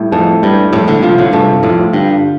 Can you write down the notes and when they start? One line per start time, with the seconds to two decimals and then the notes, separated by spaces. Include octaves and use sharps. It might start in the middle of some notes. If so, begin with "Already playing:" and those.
Already playing: A2 G3
0.12 F2 A4
0.42 G2 G3
0.73 F2 A2 A4
0.88 A2 D3
1.02 C3 F3 F4
1.18 A2 D3
1.33 G2 C3 A4
1.63 F2 A2 F4
1.93 G2 D3